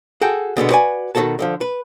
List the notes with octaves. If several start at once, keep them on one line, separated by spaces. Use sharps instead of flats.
F#4 G#4 A4 G5
B2 D3 G#3 B3
F#4 B4 D5 G#5
B2 D#3 D#4 F#4 A4 A5
D3 D#3 F3
B4